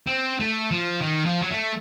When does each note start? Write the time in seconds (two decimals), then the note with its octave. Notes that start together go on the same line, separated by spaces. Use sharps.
0.07 C4
0.40 A3
0.71 F3
1.02 D#3
1.26 F3
1.42 F#3
1.50 A3